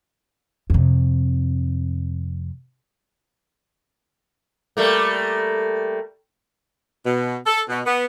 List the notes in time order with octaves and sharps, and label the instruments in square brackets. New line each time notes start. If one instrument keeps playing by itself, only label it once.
[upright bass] F2 C3
[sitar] G3 A3 A#3
[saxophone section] B2
A4
B2
B3